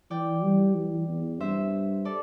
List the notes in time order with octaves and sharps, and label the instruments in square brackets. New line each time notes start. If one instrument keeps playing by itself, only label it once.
[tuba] E3 [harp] D5 G5
[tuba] G3
E3
E2
[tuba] G2 [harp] C5 E5
[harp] A4 D5